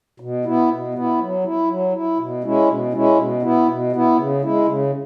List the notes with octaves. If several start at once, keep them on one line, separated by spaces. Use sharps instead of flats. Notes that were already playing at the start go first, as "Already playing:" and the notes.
B2
B3 E4
B2
B3 E4
F#3
E4
F#3
E4
B2
G#3 C#4 E4
B2
G#3 C#4 E4
B2
B3 E4
B2
B3 E4
C#3
G#3 E4
C#3